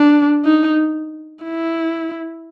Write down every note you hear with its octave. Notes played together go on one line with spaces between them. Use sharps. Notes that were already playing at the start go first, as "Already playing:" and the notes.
Already playing: D4
D#4
E4